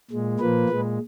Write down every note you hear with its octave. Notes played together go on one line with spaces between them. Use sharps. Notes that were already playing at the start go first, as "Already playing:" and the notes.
A#2 G#3
A#2 F3 A#3 B4
A#2 G#3